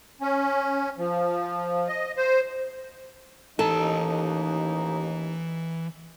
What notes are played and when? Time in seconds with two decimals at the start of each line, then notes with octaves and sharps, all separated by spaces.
0.21 C#4
0.98 F3
1.88 D#5
2.17 C5
3.59 A1 D#2 E3 D#4 A4 A#5